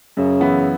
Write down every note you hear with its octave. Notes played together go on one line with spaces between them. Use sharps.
F#2 C#3
E3 B3 E4